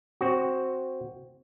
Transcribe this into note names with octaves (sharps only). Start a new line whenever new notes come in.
C4 F#4